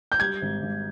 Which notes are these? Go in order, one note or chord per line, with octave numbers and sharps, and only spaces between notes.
G6
G3 G#6
G#1
G#1